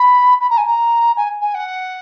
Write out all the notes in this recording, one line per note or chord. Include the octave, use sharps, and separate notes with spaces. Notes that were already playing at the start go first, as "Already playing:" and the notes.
Already playing: B5
B5
A#5
G#5
A#5
G#5
G#5
F#5